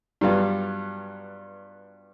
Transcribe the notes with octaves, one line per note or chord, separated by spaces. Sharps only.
G2 F#3 G3 B3 F4